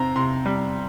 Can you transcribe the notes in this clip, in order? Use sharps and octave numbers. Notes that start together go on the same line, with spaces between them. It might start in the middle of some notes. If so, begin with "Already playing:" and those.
Already playing: C3 C4 A#5
C3 C6
G3